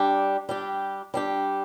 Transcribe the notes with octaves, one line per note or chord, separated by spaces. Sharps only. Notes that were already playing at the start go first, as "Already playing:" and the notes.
Already playing: G3 D4 G4
G3 D4 G4
G3 D4 G4